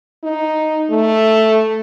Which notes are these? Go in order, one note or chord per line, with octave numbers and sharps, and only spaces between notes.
D#4
A3